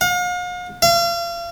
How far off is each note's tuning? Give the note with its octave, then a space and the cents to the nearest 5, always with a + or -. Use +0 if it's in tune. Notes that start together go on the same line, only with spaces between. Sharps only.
F5 +45
F5 -35